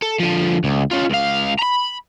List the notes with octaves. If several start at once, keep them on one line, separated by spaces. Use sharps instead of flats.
A4
D3 F3
C#2
C#4 F4
C#2 F5
A#5 B5